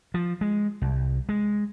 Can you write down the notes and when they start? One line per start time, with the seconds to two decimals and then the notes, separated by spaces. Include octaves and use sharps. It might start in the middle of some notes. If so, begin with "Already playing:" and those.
0.14 F3
0.41 G#3
0.82 C2
1.29 G#3